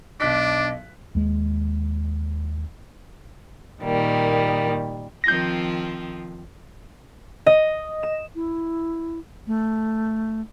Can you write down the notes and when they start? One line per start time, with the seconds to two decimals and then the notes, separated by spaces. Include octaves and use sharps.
0.20 B1 D4 D#5 D6 F#6 B6
1.15 D#2 G#3
3.83 A#2 D#3 G3 A#3
5.24 D#3 F3 C4 G6 A#6
7.46 D#5
8.03 E7
8.35 E4
9.47 A3